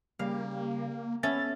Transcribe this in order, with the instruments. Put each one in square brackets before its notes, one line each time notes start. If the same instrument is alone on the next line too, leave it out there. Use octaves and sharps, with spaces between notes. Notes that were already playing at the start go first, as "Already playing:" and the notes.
[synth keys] C#3 G3 G4 [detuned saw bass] A#3 [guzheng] F5
[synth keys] B3 A4 E5 [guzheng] C#4 [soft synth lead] A6